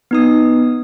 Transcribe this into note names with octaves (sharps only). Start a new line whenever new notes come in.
B3 D#4 D#6